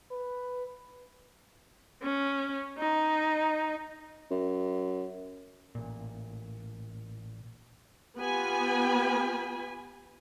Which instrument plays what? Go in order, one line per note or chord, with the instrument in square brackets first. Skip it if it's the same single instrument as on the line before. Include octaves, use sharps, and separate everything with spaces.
[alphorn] B4
[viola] C#4
D#4
[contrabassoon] F#2
[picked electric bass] A1 A#2
[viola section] B3 F4 G4 G#5 B5